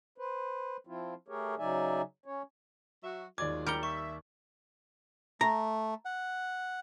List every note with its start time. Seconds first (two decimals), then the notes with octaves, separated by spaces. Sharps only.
0.18 B4 C5
0.87 F3 C4 E4 F4
1.28 A3 G4 G#4 A#4 C#5
1.58 C#3 F#3 D#4 D5 E5 G#5
2.26 C#4 C#5
3.03 F#3 F#4 E5
3.38 D#2 F#3 G#3 F4 D5 D6 G#6
3.66 G3 A#4 G6 C#7 G7
3.83 E5 C#6
5.41 A3 A#5
6.05 F#5